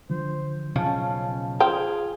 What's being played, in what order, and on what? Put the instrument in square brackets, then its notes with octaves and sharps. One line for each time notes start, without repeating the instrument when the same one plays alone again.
[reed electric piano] D3 F3 [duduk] C5
[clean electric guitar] B1 C#3 F3 [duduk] C#4 [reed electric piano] F5 A5
[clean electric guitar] F4 [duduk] G#4 [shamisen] C5 G5